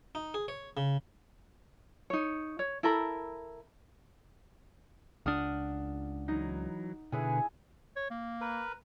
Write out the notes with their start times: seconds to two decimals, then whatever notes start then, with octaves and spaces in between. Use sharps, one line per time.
0.15 D#4
0.34 G#4
0.48 C#5
0.77 C#3
2.10 D#4 C#5
2.59 C#5
2.83 E4 A4 A#4 B5
5.26 C#2 D4 F#5 D#6 F6
6.28 E3 F#3 D#4
7.12 B2 D3 E4 G#4 B4 G#5
7.96 C#5
8.11 A#3
8.41 A#4 B4